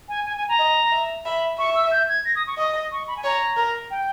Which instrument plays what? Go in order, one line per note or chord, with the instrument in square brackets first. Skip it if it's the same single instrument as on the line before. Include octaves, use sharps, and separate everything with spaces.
[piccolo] G#5
G#5
G#5
A#5
[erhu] D#5
E5
[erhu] E5 [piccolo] B5
[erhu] E5 [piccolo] C#6
[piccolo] E6
G6
G#6
A#6
D#6
C#6
[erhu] D#5 [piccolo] D#6
[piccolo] C#6
B5
G#5
[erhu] C#5 [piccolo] A#5
[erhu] A#4
[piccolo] G5